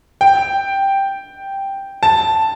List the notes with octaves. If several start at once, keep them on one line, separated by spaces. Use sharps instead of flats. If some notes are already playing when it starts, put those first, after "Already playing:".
G5
A5